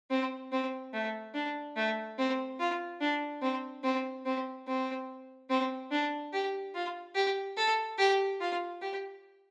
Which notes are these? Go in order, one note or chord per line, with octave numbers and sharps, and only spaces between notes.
C4
C4
A3
D4
A3
C4
F4
D4
C4
C4
C4
C4
C4
D4
G4
F4
G4
A4
G4
F4
G4